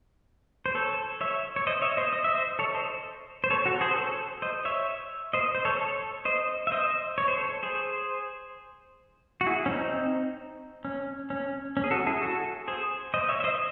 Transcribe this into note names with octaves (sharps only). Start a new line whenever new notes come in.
C5
A4 C#5
C#5 E5
C#5
C5 D#5
C#5 E5
C5 D#5
D#5
E5
C5 D#5
A4 C#5
C5 D#5
C5
A4 C#5
F#4 A4
G#4 C5
C5
A4 C#5
C5 D#5
C#5 E5
C5 D#5
C5
A4 C#5
A4 C#5
C5 D#5
E5
C5 D#5
C#5
C5
A4 C#5
G#4 C5
F#4
E4 G#4
C#4
C4 D#4
C#4
C#4
C#4
G#4
F#4 A4
E4 G#4
F#4 A4
G#4 C5
C5 D#5
C#5 E5
E5
C5 D#5